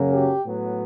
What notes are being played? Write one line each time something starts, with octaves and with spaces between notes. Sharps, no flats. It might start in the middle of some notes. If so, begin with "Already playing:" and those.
Already playing: F#2 C#3 F#3 A#3 C#4
G4
A2 F#3 B3